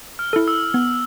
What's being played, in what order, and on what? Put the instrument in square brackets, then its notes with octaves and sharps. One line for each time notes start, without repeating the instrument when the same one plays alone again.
[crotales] F6
[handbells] E4 A4
[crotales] E6
[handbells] B3